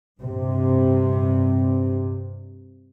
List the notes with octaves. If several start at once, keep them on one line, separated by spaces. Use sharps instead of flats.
G2 C3